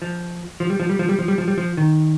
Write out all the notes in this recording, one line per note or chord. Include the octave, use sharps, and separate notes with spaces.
F3
F3
G3
F3
G3
F3
G3
F3
G3
F3
G3
F3
D#3